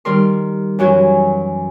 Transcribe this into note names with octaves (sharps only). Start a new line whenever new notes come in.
D#3 G3 A#4 C6
F#2 E3 F#3 F#4 G#5